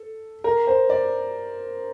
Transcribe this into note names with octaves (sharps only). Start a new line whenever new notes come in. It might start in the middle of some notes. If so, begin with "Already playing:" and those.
Already playing: A4
A#4
C5
D5